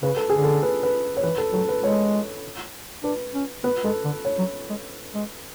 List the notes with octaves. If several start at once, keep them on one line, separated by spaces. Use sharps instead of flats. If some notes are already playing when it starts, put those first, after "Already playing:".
C#3 B4
A4
D3 G#4
A4
B4
B4
C#5
E3 B4
A4
F#3 A4
B4
G#3 C#5
D4 B4
C#4
B3 B4
G#3 A4
D3
C#5
F#3
G#3
G#3